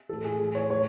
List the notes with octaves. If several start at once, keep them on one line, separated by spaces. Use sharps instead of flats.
A2 E3 A4
G#4
A2 E3 G#4
C#5
A2 C#5